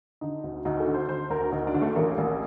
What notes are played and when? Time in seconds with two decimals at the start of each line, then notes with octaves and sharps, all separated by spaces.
0.21 D3 D#4
0.44 D2
0.65 D2 D#4
0.80 A4
0.87 D3
0.94 C5
1.09 D3 C5
1.30 D2 A#4
1.52 D2 D#4
1.67 D4
1.74 D3
1.82 A3
1.96 A1 A#3
2.18 A1